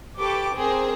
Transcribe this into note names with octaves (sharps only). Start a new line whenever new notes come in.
G4 A4 B4 C#6 D6
C4 G#4 A#4 C5